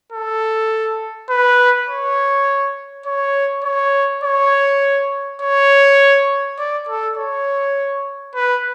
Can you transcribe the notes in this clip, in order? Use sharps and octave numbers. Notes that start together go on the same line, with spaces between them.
A4
B4
C#5
C#5
C#5
C#5
C#5
D5
A4
C#5
B4